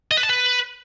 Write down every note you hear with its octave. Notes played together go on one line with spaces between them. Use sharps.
D#5
B4
A5
B4